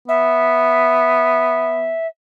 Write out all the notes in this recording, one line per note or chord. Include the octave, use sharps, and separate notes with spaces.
B3 E5